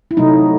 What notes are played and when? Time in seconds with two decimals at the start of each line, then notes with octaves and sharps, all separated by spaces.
0.11 E4
0.17 C3 F#3 A3 D#4